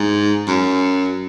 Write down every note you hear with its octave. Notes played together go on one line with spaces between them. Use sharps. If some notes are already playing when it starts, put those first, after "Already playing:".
Already playing: G#2
F#2